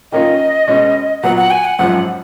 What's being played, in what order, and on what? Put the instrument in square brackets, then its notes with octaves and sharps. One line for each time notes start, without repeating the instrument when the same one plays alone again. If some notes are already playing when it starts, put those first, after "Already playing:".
[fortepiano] D#3 A#3 C#4 F4 [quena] D#5
[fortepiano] B2 G#3 C#4
[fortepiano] A#2 F#3 B3 [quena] F#5
[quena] F#5
G#5
F#5
[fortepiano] G#1 F#2 F3 [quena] F#5